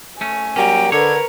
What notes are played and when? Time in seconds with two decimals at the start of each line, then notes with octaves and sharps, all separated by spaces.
0.21 A3 C#4 G#5
0.56 F#3 G3 A#3 C#4 G5
0.92 D3 A#4 B4 C#5 G#6